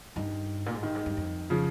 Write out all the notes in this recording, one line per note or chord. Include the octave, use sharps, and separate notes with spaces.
G2 D#3
A#2
G#2
G2 D#3
G#2
G2
F2
C#3 F3